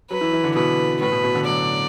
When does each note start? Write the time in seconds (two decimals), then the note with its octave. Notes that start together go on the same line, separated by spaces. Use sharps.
0.10 F#3 B4
0.21 E3
0.33 E3
0.44 D3
0.55 B2 B4
1.01 A2 B4
1.12 B2
1.24 B2
1.35 D3
1.46 F#3 D5